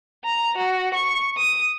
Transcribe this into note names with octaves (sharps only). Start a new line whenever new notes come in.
A#5
F#4
C#6
D#6